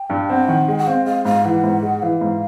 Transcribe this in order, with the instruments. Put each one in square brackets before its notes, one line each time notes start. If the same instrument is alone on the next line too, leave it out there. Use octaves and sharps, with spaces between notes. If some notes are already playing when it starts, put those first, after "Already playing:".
Already playing: [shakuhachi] G5
[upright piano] G2
[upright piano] C4 [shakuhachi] F#5
[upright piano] D#3
[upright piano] G#3 [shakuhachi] G5
[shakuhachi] F#5
[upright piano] C4 [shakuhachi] F5
[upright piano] G#3 [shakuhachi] F5
[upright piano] G#2 [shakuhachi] F5
[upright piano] E3 [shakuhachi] F#5
[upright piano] G#2
G#3
[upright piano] E3 [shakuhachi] F5
[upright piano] G#2